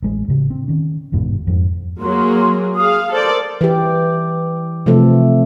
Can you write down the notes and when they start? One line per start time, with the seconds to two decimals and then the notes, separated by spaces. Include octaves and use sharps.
0.03 A1 G#3
0.28 A2 C#3
0.50 C4
0.68 D#3 C#4
1.12 G1 E2 G#2 B2
1.47 F2 G#2
2.01 F#3 A#3 G#4 C6
2.76 G#4 F5 D#6
3.11 A4 A#4 C5 D5
3.61 E3 G4
4.86 C3 F3 A3 A4